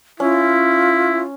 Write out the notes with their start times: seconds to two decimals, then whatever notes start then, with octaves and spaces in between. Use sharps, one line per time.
0.20 C#4 E4 F4